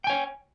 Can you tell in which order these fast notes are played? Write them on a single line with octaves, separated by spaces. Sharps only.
G5 G#5 C#5